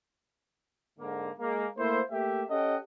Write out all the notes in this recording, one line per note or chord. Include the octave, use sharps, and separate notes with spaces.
G#2 D3 A#3
G#3 A#3
A3 A#3 E4 C5
A3 A#3 G4 E5
C#4 G4 A4 D#5 F#5 G5